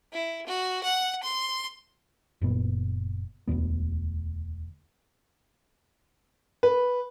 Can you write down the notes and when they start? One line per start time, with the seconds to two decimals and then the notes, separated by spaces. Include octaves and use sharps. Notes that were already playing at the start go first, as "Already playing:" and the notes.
0.13 E4
0.47 F#4
0.84 F#5
1.23 C6
2.42 F#1 A#2 B3
3.48 E1 D2 G2 B3
6.63 B4